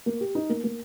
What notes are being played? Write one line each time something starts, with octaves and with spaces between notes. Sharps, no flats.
A#3
G4
D#4
A#3
A#3